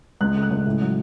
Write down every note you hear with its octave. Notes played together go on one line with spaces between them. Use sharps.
C#2 F#6
A3
F#6
C#2
A2
F#3